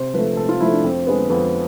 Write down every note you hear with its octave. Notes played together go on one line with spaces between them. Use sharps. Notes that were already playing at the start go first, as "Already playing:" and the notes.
Already playing: C3 C5
F3 A3 B4
C3 A4
F4
F3 A3 E4
D4
F2 C4
D3 G#3 B3
F2 B3